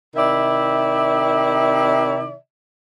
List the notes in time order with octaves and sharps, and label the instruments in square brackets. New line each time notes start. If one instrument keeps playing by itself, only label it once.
[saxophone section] C3 D#3 E4 D5 E5